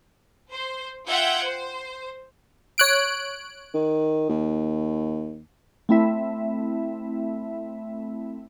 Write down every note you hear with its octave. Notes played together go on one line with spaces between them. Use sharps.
C5
F4 E5 F#5 G5 G6 G#6
C5
C#5 F#6 D7
D#3
D#2
A3 C4 E4 E5